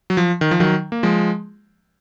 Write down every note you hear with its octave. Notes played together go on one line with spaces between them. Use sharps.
F#3
F3
D#3
F3
D#3 F#3
A#3
F3 G#3